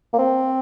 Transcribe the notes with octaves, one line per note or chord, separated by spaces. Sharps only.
A#3
C4